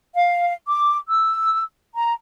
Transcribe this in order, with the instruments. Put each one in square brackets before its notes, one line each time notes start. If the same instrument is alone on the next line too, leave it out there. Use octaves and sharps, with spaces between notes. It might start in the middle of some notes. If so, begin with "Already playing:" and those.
[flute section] F5
D6
E6
A#5